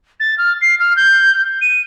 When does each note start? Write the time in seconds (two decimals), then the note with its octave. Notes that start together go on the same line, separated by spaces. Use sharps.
0.20 A6
0.38 F6
0.61 C7
0.80 F6
0.96 G6
1.62 D#7